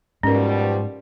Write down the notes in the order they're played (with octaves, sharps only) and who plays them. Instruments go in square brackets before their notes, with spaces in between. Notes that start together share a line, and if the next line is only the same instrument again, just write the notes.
[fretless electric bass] G#2 [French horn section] B2 F3 G3 [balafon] C#4 A#4